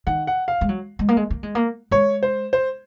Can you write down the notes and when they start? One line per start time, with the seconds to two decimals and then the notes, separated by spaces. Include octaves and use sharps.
0.07 D#3 F#5
0.27 F#5
0.48 F5
0.61 G#3
0.69 F#3
0.99 G#3
1.09 A#3
1.17 G#3
1.30 A#3
1.43 G#3
1.55 A#3
1.91 G#3 C#5
2.23 C5
2.53 C5